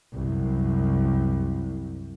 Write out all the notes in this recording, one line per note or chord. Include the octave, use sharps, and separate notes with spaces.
C2 F#2